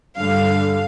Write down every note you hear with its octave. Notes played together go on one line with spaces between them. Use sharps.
G2 D3 G3 F5